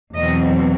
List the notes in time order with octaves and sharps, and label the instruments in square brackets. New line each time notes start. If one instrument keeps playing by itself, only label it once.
[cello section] E2 B2 F#3 C4 D#5